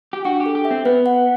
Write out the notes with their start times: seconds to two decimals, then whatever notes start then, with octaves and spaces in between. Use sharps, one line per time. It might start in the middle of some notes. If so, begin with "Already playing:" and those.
0.13 G4
0.25 D4 F#4
0.40 G4
0.46 A4
0.55 G4
0.65 E5
0.71 C4
0.85 B3 B4
1.06 F#5